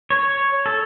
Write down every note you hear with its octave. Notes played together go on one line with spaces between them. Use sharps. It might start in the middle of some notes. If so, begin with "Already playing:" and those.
C#5
A4